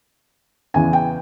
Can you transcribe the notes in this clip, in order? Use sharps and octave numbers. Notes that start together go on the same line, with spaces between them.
E2 C#3 E3 G#5
G5